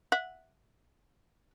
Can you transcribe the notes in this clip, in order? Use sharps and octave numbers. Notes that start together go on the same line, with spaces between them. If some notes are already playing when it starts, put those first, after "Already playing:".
E5 F#5